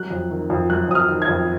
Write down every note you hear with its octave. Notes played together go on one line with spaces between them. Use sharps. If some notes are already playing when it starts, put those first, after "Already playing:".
Already playing: F#3 F#6
F2
D#3
F2
F#3 F#6
F2 D#6
F6
D#3
G#6
F2